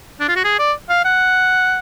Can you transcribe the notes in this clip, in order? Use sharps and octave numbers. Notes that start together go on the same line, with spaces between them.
D4
F4
F#4
G#4
D5
F5
F#5